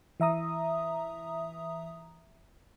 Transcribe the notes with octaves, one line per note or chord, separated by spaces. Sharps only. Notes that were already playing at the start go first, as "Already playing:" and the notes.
E3 E5 A#5 D#6